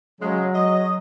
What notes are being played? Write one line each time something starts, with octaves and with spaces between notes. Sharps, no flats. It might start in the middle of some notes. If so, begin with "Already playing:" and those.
C#3 F#3 G#3
D#5